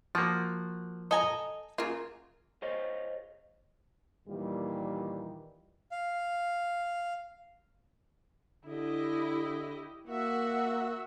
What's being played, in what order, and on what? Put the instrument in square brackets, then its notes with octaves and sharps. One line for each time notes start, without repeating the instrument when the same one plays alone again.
[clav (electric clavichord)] F3 A#3 [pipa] F#4
[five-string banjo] A4 G#5 A#5 [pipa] D#5
[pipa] C#3 F#3 A#3 [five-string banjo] F4
[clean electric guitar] G#4 C5 C#5 D#5 F5
[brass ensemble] D#2 A#2 D#3 E3 G3
[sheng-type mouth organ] F5
[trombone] D3 [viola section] E4 G4 D#5
[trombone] A#3 [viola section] F#4 E5 F#5